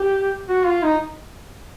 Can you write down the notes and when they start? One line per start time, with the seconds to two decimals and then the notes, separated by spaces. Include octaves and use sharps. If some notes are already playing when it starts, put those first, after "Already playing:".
Already playing: G4
0.49 F#4
0.66 F4
0.83 D#4